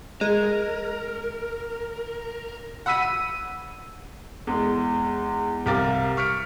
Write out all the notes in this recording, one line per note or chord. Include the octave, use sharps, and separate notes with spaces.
G#3 A#4
F#5 B5 E6 B6 D#7
D#7
E2 G#3
C2 G4 A#4 F5 D6 A6
C#6 F6 B6 C#7 D7